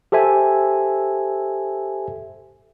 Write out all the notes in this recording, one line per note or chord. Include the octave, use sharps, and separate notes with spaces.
G4 A4 C5 E5 G#5